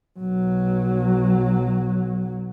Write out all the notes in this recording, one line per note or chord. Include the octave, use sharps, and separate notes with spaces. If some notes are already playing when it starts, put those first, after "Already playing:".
B1 F#3